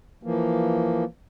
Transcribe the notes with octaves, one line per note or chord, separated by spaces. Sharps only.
E3 F3 A#3